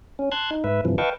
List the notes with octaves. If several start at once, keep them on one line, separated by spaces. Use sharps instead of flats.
C#4
A5 C6 F#6 G#6
D#4
G#2 B4 E5
G2 C3 E3 F3
B4 D#5 F5 G5 A5 C#6